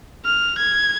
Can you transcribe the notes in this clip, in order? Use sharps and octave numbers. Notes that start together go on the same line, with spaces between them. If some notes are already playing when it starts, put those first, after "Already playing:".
F6
G#6